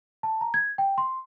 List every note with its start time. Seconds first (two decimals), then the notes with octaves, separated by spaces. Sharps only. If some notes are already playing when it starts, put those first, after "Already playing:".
0.23 A5
0.41 A#5
0.54 G#6
0.78 G5
0.98 C6